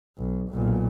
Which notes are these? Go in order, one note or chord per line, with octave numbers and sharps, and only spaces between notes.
B1
B1 A#2